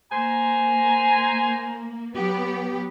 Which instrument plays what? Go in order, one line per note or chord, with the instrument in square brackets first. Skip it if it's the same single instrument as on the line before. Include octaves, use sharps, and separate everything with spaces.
[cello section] A#3 [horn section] C5 G#5 A#5
[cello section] F#3 B3 G4